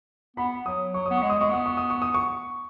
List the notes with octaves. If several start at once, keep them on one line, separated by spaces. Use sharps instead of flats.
B3 B5
F#3 D#6
F#3 C#6
B3 D#6
C#6
G#3
D#6
G#3 C#6
B3 D#6
C#6
D#6
C#6
D#6
C#6